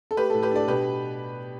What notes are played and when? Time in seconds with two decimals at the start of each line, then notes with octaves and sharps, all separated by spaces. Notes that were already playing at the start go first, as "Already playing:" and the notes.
0.11 A4
0.17 A3 G4 B4
0.30 A4
0.34 A2
0.42 G4 B4
0.51 D4 A4 D5
0.68 B2 G4 B4